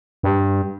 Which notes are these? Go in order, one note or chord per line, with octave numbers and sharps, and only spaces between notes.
G2